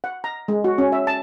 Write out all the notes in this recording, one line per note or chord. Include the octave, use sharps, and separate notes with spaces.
F#5
A#5
G#3
F#4
C#4
E5
A5